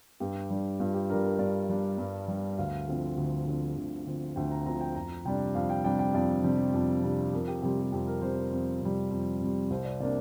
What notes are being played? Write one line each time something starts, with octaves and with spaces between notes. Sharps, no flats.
G2 G4
G3 D4
G2 F4
G4
G3 D4 A#4
A#4
G2 D5
G3 D4
G2
G3 D4
D2 F5
D3 F3 C4
D2
D3 F3 C4
D2
D3 F3 C4
D2 G5
A#5
D3 F3 C4 A#5
G5
F2 A#5
C3 G3 D4 G5
F2 F5
G5
C3 G3 D4 G5
G5
F2 D5
C3 G3 D4
F2
C3 G3 D4
F2 A#4
G4
C3 G3 G4
G4
F2 G4
A#4
C3 G3 C5
A#4
F2
C3 G3
F2
C3 G3
C2 C5
D5
C3 A#3 D4 D5